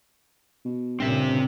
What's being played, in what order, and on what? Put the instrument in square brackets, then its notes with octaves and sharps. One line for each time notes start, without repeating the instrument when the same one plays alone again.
[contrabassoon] B2
[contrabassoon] G2 [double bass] A#2 C#3 [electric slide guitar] C4 E5